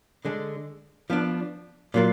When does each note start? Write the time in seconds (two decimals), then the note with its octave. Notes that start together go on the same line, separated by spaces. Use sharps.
0.25 D3 G#3 D4
1.10 F3 B3 D4
1.94 A#2 F#3 A#3 F4